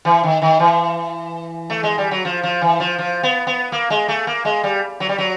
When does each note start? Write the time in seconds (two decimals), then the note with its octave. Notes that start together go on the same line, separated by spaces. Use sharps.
0.05 E3
0.24 D#3
0.42 D#3
0.59 E3
1.70 A3
1.83 G#3
1.98 G3
2.11 F#3
2.25 F3
2.43 F3
2.61 E3
2.80 F3
2.98 F3
3.23 B3
3.47 B3
3.72 A#3
3.90 G#3
4.08 A3
4.27 A#3
4.45 G#3
4.64 G3
5.00 F#3
5.09 G3
5.18 F#3